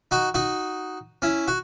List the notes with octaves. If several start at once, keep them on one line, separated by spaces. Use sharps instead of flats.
D#4 F#4
D#4 F#4
C#4 E4
F#4